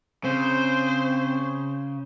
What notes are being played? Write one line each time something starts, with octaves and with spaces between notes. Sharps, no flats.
C#3 C4 C5